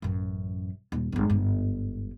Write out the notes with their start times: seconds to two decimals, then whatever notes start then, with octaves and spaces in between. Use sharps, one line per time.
0.02 A1 F#2
0.92 D#1
1.12 G1 G#3
1.30 G1 G#2